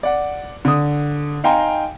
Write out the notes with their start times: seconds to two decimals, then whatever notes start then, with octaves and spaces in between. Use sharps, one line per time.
0.03 D5 F#5
0.65 D3 D#6
1.44 D#4 F5 G5 G#5 A#5 C6